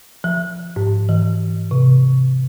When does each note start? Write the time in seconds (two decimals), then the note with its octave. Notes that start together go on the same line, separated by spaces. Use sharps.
0.24 F3
0.76 G#2
1.09 E3
1.71 C3